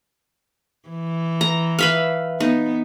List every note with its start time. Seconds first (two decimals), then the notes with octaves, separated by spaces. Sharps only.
0.89 E3
1.41 A#5
1.79 B4 E5 F5
2.40 B3 D#4